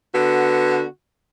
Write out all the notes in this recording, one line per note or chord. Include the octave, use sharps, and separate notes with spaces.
D3 B3 F#4